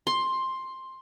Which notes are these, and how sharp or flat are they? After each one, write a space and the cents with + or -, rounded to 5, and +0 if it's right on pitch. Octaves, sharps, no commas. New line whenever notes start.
C6 +10